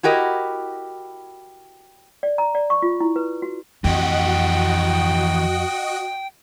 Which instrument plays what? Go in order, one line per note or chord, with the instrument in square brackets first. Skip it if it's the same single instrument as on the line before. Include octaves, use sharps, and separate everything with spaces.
[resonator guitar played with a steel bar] E4 F#4 G4 A#4 D#5
[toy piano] D5
A#5
D5
C#6
F4
E4
B4
F#4
[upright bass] F2 [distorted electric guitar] E3 G4 [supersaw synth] F#4 D#5 F#5 [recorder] G5